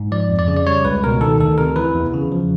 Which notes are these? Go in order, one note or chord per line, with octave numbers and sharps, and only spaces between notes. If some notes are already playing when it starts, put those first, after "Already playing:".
Already playing: G#2
F3 D5
F2
D5
C#3
D5
G3 C#5
C#2 B4
B2 A#4
D#3 A4
D2 A4
C3 A#4
E3 B4
E2
C#3
F3